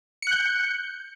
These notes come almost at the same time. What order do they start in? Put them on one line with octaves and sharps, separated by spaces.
C#7 F#6 G6